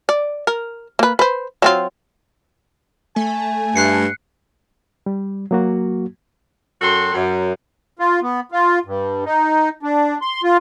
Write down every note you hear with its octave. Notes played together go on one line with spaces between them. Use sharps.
D5
A#4
A#3 B4
B4 C5
F#3 C4 F4
A3 G#5
G2 F#6 C7 C#7
G3
F#3 A#3 F#4
F#2 F#4 A4 G5 C6
F#2
F4
B3
F4
G2
D#4
D4
C6
F4